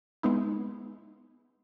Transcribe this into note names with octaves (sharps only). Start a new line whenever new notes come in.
G#3 B3 D#4 E4